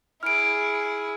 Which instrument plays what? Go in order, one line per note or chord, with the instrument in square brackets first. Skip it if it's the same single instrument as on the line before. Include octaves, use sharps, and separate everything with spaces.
[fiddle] E4 G#4 [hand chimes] F6 D7